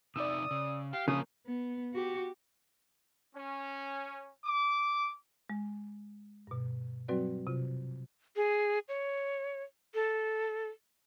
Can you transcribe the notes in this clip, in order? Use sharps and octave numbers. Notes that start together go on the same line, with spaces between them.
C3 D#4 D5 E5 D#6 E6
C#3
G4 F5
C#3 F3 A#3 A#4 D#6
B3
F#4 G4
C#4
D6
G#3
G2 B2
F#3 G3 C4 F#4 B4 D5
C3 F4
G#4
C#5
A4